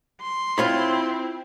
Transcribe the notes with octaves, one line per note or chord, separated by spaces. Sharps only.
C6
C4 E4 F4 C#5 B5